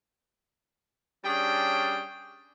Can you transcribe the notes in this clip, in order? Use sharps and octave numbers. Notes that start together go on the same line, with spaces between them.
G3 C#4 D4 G#4 C#5 G5